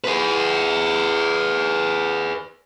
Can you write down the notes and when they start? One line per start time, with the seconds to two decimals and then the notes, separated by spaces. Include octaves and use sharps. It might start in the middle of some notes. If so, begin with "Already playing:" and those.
0.04 G#4 B4